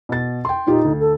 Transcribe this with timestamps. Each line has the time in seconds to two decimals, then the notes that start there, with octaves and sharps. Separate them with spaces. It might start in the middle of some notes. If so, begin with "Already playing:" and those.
0.09 B2 A6
0.45 G5 C6
0.67 A#2 D#4 F4 G4
0.84 D2
1.00 A4